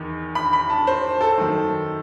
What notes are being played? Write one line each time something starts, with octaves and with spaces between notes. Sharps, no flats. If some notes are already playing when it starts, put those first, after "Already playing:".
Already playing: E2 D#3
B5
B5
A5
C5
A4
F#2 D#3